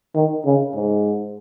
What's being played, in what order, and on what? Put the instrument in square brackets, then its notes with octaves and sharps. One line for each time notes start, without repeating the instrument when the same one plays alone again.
[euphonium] D#3
C#3
G#2